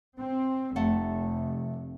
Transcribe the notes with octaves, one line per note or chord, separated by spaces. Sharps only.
C4
F1 C3 A3 F#5